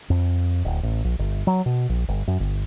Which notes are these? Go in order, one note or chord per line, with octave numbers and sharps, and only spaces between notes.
F2
D1
A1
A#1
G1
F#3
B2
A#1
G1
F#2
G1